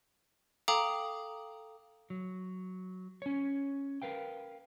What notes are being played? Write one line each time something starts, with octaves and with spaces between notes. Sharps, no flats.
A4 F5 G5 A#5 D6 D#6
F#3
C#4 C#5
A#4 B4 F5 G5